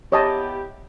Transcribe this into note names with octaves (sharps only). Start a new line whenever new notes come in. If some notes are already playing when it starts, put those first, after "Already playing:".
B3 E4 G4 C#5 D#5 A5